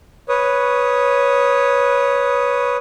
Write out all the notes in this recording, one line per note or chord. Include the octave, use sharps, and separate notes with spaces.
B4 C#5 D#6